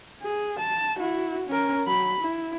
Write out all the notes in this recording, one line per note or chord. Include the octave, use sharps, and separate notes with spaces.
G#4
A5
E4 F#4
C#4 A#4
F#3 B5
E4